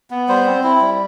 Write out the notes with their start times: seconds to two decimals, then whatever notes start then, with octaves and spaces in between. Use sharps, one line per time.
0.10 B3
0.28 G3 C5
0.46 C4
0.63 E4
0.81 G3